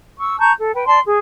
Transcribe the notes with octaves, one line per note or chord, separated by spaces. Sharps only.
C#6 E6
A5 A#5 C#6 G6
A4
B4 G5
D5 A5 C6
G#4